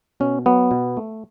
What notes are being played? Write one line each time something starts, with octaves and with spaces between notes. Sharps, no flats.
B2 C#4
F#3 B3
B2
A3